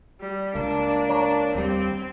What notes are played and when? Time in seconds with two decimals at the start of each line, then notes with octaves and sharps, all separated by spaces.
0.21 G3
0.55 C#2 A#3 D4
1.09 C#5 A#5
1.55 D#2 G3 C4